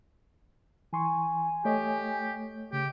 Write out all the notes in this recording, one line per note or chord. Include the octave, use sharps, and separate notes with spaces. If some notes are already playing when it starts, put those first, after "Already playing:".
E3 G#5 C6 C#6
A3 G4 C#5 D#5
C#3 G4